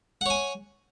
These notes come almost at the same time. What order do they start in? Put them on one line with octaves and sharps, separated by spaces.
F#5 C#5 G#5